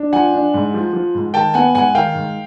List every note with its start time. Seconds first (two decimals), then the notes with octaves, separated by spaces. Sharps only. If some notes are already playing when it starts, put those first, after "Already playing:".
Already playing: D4
0.13 F3 F#5 G#5
0.34 D4
0.54 G#2
0.74 F3
0.93 F3
1.15 G#2
1.34 D#3 G5 A5
1.54 B3 F#5 G#5
1.74 G#2 F#5 G#5
1.95 D#3 F5 G5
2.14 G#2